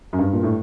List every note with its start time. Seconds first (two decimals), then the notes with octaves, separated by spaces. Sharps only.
0.13 F#2
0.19 G2
0.33 A#2
0.43 A2